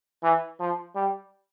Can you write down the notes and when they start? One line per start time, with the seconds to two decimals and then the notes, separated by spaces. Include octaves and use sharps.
0.23 E3
0.60 F3
0.95 G3